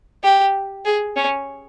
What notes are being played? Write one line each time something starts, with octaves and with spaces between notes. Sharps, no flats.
G4
G#4
C#4